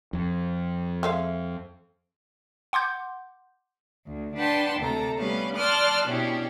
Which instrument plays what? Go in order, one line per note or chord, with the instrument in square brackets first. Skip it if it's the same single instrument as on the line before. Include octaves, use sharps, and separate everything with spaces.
[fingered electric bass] F2
[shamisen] G#3 E5 F5
[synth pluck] F#5 C6 D6 G6
[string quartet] D2
D4 B4 F#5 G5 A5 C6
D2 C3 A4 A#5
G3 A3 B3 C#4 B4 F5
D5 A5 C6 D#6 F6 F#6
B2 C#4 D4 E4 G4